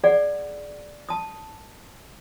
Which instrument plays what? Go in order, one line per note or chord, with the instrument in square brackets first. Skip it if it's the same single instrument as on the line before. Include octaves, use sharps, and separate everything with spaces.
[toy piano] G#4 D5 F#5
A5 D#6